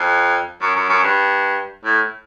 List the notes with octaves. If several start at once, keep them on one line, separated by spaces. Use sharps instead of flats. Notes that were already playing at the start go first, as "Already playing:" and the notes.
Already playing: F2
F#2
F#2
F#2
G2
A2